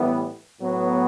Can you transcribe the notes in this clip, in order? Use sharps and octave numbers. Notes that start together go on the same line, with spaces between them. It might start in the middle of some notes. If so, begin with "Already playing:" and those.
Already playing: A2 E3 G3 B3 E4
A2 F#3 B3